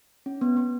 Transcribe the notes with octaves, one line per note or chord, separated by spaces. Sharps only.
C#4
B3
B3